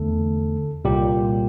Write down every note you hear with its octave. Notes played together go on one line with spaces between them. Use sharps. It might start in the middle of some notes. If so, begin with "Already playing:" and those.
Already playing: E2 D3 A3 A4
C2 A#2 G3 A#3 G4